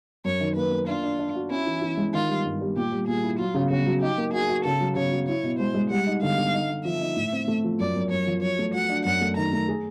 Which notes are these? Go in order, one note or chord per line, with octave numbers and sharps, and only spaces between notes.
F#2 C#5
D#3
A#3 B4
A#3
D4 F4
D4
D4
F#4
C#4 E4
E3
E3
G#3
D#3 F4
G3
G2
G3
A#2 G4
G3
A#2 G#4
E4
F#3 F4
C#3
C#3 F#4
F#3
D#4 G4
A#3
F#4 G#4
F#4
C#3 A4
F#3
C#3 C#5
F#3
E4 C#5
B2
G#3 C5
G#3
G3 F#5
D#4
D3 F5
D3
D#4
D#4
F3 E5
D#4
A2
C4
A3
F3
F#2 D5
F#2
F#2 C#5
F3
F#3 C#5
A3
F#3 F#5
D4
F#2 F#5
A3
D#3 A#5
A3
G#4